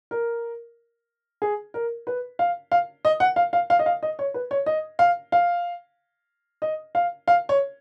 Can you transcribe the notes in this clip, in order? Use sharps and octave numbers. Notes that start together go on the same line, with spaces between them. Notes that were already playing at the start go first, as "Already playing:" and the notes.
A#4
G#4
A#4
B4
F5
F5
D#5
F#5
F5
F5
F5
D#5
F5
D#5
C#5
B4
C#5
D#5
F5
F5
D#5
F5
F5
C#5